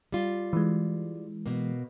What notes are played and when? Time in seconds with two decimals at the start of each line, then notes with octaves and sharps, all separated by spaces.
0.12 G3 F4
0.53 E3 G#3
1.46 B2 A#3